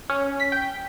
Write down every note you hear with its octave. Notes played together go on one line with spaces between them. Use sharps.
C#4
B6
G5